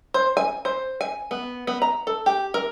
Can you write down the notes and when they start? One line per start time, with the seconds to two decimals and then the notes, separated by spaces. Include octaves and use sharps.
0.14 C5
0.37 G#5
0.65 C5
1.01 G#5
1.31 B3
1.67 B3
1.82 A#5
2.07 A4
2.26 G4
2.54 A#4